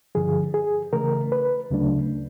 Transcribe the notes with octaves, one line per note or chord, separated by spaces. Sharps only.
G2 D3 F3 G#4
G#4
C#3 E3 A3 A#4
B4
D2 C#3 F#3 A3 D4